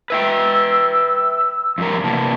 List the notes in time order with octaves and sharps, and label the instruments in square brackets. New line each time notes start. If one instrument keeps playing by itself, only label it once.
[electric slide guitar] B4 E5 G5 [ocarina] E6
[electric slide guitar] F2 G3 A#4
[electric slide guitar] C3 E3 A#3 [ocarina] A5